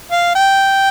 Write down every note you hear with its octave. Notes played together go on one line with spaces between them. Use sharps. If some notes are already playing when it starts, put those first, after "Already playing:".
F5
G5